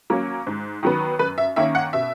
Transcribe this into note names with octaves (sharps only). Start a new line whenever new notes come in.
F#3 A#3 C#4
G#2
D#3 F#3 B3
F#2 B4
E5
D#3 A#3 C#4 E5
F#5
B2 E5